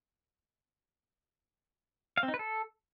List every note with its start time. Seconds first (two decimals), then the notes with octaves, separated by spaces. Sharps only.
2.17 F5
2.23 C4
2.28 D#4
2.34 B4
2.39 A4